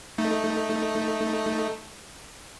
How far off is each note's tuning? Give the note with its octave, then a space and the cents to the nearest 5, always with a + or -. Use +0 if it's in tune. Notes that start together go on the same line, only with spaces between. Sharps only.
A3 +0 D#4 +5